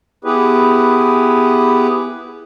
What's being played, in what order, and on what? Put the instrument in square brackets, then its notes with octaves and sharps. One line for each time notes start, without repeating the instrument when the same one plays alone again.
[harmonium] B3 E4 G4 G#4 B4